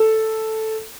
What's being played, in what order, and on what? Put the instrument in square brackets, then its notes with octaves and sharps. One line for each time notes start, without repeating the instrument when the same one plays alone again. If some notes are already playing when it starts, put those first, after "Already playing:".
Already playing: [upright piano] A4